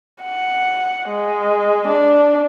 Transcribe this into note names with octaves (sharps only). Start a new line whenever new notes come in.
F#5
G#3
D4